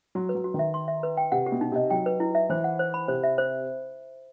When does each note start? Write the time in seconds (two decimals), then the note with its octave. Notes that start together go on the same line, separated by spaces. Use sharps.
0.15 F#3 F#4
0.29 B4
0.35 F#3
0.44 F#4
0.54 D#3
0.59 E5
0.74 C6
0.88 E5
1.03 B4
1.17 G5
1.32 C3 F#5
1.46 G4
1.52 B2
1.61 D#4
1.72 C3 D#5
1.90 F#3 G5
2.06 B4
2.20 E4
2.35 E5
2.50 E3 C5
2.64 F#5
2.79 C5
2.94 B5
3.08 C3 C5
3.24 E5
3.38 C5